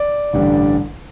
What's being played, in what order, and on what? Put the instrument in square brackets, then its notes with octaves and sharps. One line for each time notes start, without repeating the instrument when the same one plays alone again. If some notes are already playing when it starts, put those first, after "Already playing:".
Already playing: [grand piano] D5
A1 G2 D3 G3